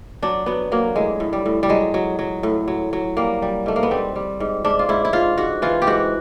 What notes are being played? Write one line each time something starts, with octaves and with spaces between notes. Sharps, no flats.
F#3 D4
F#3 B3
F#3 A#3
A2 G#3
A2
G3
A2
G3
F#3 G#3
F#3
F#3
A2
F#3
F#3
G3 A#3
G3
G#2 A3
A#3
B3
G3 C4
G3
G#2
G#2 D4
F4
G#2 E4
E4
G#2 F4
G#2 F#4
E3 F4
G4
G#2 F#4